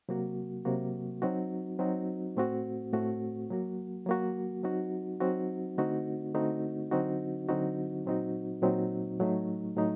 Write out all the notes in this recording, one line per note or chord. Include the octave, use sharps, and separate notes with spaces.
C3 F#3 A#3 F#4
C3 F#3 A#3 F#4
F#3 C4 D#4 F#4
F#3 C4 D#4 F#4
A2 A3 C4 F#4
A2 A3 C4 F#4
F#3 A#3 F#4
F#3 A#3 F#4
F#3 C4 D#4 F#4
F#3 C4 D#4 F#4
D3 A3 C4 D#4 F#4
D3 A3 C4 D#4 F#4
D3 F#3 C4 D#4 F#4
D3 F#3 C4 D#4 F#4
A#2 F#3 C4 D#4 F#4
A#2 F#3 C4 D#4 F#4
A2 F#3 A3 D#4
A2 F#3 A3 D#4